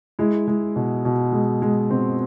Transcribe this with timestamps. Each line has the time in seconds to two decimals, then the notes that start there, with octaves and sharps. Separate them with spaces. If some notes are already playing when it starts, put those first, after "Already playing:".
0.19 G#3 E4
0.48 G#3
0.76 B2
1.05 B2
1.32 G#3
1.62 G#3
1.91 B2 C4